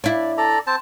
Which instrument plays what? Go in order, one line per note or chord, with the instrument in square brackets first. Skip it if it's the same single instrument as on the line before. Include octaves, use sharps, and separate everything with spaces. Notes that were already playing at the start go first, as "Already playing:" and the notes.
[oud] D4 E4 [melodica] D5
[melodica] A4 D5 A#5
C4 C5 A5